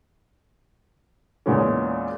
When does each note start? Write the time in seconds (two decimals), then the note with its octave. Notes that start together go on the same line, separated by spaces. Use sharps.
1.46 E2 A#2 G#3 C#4